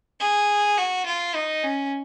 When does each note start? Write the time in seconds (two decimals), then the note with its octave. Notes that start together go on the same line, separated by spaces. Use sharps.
0.20 G#4
0.78 F#4
1.06 F4
1.35 D#4
1.64 C#4